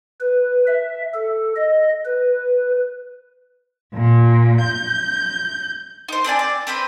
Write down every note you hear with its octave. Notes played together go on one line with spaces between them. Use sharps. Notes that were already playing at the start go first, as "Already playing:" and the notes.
B4
E5
A4
D#5
B4
A#2
G6
D#4 C5
C4 D4 D5 G#5
D5
C4 B4 C5 B5